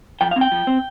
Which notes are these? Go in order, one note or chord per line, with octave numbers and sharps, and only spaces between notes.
F3 G5
F5
C4
G5
F3
C4